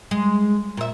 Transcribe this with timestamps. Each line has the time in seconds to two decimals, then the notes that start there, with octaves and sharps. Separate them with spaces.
0.11 G#3
0.77 A#2 E5